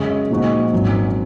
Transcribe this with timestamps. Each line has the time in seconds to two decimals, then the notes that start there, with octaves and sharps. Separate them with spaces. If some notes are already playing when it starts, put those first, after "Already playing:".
Already playing: F#2 C#3 G#3 C#4 G#4
0.30 A#2 F3 G#3 D#4 F#4
0.73 G#1 G#2 F#3 C#4